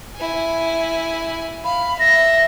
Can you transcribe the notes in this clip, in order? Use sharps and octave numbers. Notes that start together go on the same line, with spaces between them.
E4 G#5
F5 B5
E5 A#6